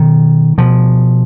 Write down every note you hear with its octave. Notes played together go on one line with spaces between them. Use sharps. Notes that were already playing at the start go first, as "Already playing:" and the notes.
Already playing: B2 D#3
B2 F3